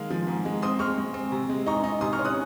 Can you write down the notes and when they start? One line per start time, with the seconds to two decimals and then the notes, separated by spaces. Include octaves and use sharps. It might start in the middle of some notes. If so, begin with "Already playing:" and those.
Already playing: D#3 G#3 F5
0.10 F3
0.27 G#2
0.45 G#3
0.62 C4 C6 D#6
0.79 G#3 C#6 F6
0.98 G#3
1.14 C4
1.32 C3
1.49 G#3
1.66 D#4 A#5 C#6
1.84 D#4
2.01 C3 C6 D#6
2.13 C#6 F6
2.19 C#4
2.25 D#6 F#6